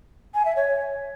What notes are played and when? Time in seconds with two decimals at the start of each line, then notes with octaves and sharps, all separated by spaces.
0.34 G#5
0.45 E5
0.56 C#5